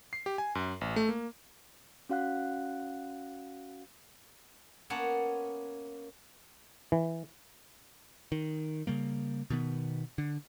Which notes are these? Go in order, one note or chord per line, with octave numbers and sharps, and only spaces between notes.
C7
G4
G#5
F#2
A1
A3
A#3
C#4 F#4 F5 F#5 F#6
A#3 B3 C#4 C#5 F#5 A5
E3
D#3
C#3 G3 A#3
B2 D#3 B3
D3